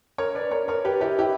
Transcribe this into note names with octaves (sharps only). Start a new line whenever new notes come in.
A#4 C#5
B4 D5
A#4 C#5
A#4 C#5
G4 B4
E4 G4
E4 G4